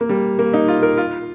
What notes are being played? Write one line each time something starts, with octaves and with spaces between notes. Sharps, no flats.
A#3
G3
A#3
D#4
F4
A#4
F4